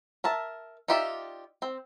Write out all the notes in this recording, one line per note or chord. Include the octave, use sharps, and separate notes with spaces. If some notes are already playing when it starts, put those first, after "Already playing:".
A#4 E5 A5
D#4 F4 G4 D5 E5
C4